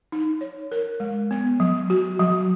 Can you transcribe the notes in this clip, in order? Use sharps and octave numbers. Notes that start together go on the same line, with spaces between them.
D#4
C#5
A#4
G#3
B3
F#3
F#4
F#3